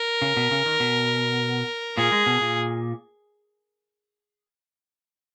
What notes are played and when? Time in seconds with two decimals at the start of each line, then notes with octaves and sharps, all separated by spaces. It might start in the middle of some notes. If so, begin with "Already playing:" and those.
Already playing: A#4
0.22 C#3
0.37 B2
0.51 C#3
0.66 D#3
0.80 B2
1.97 A#2 G#4
2.12 G#3
2.26 B2
2.41 A#2